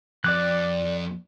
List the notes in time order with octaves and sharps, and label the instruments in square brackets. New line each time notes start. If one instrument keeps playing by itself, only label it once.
[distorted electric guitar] F2 [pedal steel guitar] D5 D6 F#6